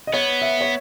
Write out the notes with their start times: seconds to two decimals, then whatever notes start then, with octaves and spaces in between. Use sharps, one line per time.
0.07 D#5
0.13 B3 C#5
0.42 E5
0.61 C#5